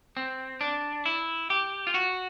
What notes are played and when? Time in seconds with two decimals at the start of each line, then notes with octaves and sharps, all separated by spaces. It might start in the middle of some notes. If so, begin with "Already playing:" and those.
0.17 C4
0.61 D4
1.06 E4
1.50 G4
1.87 F4
1.94 F#4